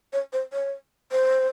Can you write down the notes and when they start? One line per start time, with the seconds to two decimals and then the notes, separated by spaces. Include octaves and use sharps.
0.13 C#5
0.33 C5
0.53 C#5
1.12 C5